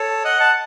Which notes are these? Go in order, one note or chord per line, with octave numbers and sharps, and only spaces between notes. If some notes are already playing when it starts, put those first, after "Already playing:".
Already playing: A4 C#5
D#5 F#5
F#5 A5